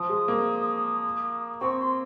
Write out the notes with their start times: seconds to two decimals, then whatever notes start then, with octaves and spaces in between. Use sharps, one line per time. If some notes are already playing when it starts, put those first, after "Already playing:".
Already playing: F3 D#6
0.09 G#3
0.28 A#3
1.61 C4 C#6
1.80 C6